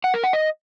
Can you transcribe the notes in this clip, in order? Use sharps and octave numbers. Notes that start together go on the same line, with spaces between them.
F#5
A#4
F#5
D#5